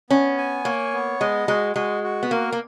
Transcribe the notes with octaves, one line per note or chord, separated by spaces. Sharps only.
B3 C#4
G#5
A#3 C#5
B3
G#3 D#5
G#3 F#4
G#3 F#4
F#4
B3
A#3 A#4
A#3